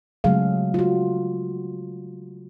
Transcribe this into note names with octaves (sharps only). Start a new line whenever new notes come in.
C#3 F#3 G#3 A3 G#4 F5
F4 F#4